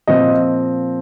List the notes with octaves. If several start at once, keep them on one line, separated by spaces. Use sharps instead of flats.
A#2 F3 C4 D#5